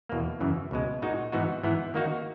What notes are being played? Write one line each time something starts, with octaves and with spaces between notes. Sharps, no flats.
E2 B2 A#3
F#2 C#3 E3
C#2 B2 G#3
A#2 G#3 D#4 F#4
G#2 E3 B3 D#4 F#4
G#2 E3 B3 E4
D#3 A#3 D#4 F#4